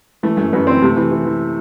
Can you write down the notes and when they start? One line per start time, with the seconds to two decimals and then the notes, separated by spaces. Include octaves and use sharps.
0.23 E3 A3
0.37 F#2 A3
0.53 F#2 B3
0.67 E3 C4
0.82 C3 A3
0.97 E3
1.11 E3
1.25 E3